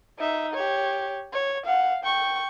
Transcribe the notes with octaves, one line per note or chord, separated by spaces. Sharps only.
D#4 E5
G4 C#5
C#5
F5 F#5
G5 C#6